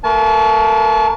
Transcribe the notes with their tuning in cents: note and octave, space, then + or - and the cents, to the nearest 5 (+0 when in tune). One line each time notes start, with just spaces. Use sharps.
A3 +40 A#4 +35 A5 -35